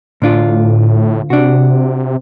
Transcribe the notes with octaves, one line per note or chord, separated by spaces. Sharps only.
D2 A2 D4 F4
C3 D4 F#4